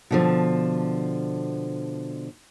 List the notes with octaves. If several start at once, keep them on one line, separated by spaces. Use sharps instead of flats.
B2 D3 F3